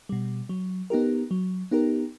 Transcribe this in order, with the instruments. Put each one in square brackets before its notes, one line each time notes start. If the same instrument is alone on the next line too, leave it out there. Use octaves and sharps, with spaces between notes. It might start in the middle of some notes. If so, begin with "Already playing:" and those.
[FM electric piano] B2 G3
F#3
B3 D#4 G4 A#4
F#3
B3 D#4 G4 A#4